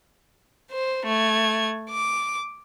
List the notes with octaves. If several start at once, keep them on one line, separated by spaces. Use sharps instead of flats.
C5
A3 G#6
D6